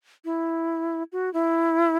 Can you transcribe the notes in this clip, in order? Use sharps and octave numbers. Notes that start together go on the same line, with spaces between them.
E4
F#4
E4